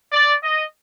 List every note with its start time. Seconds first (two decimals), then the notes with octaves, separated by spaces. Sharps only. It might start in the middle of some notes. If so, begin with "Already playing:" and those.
0.13 D5
0.43 D#5